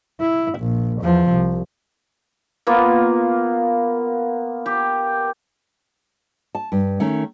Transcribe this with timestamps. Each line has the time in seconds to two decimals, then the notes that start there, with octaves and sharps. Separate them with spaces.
0.21 E4
0.59 A#1
1.02 E2 F3
1.31 C2
2.67 A#3 B3 F4
4.66 G4
6.55 A5
6.72 G2
7.00 D#3 A3 C#4